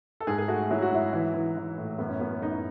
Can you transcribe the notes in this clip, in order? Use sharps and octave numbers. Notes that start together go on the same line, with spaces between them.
A4
G#2 G#4
G#4
A3 F#4
F#3 E4
F#4
G#2 E4
E3
E3
E3
A2
F#2 B3
C#4
F#2 B3
F#2 D#4
E4